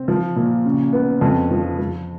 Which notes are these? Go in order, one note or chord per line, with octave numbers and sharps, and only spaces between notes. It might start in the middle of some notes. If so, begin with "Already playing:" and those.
Already playing: C4
F3
A#2
C#3
B3
F2
F3
F3